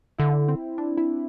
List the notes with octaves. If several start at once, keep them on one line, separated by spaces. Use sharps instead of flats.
D3 E4
C4
D4
E4